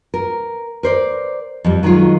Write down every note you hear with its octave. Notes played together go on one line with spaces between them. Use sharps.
A#4
A#4 C5 D5
F2 G3
D#3 F#3 G#3 F4